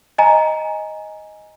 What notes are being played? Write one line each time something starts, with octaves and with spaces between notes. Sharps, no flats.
D#5 G#5 A#5